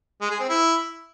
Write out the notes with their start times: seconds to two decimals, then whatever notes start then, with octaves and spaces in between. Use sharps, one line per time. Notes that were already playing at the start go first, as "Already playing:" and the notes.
0.21 G#3
0.31 G#4
0.40 C4
0.49 E4